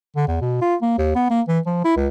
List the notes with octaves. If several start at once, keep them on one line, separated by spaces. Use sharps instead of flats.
D3
E2
B2
F4
A#3
D#2
B3
A#3
E3
F3
E4
C#2